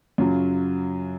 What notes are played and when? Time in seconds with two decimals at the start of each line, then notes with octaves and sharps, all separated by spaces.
0.18 F#2 C#3 F#3 F4